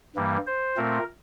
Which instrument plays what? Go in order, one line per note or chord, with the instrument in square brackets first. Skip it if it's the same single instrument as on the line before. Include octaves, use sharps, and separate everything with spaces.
[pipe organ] G2 E3 G3 A#3
C5
A#2 A3 C4 A#4